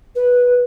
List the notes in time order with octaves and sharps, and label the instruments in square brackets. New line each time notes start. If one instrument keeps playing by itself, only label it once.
[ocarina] B4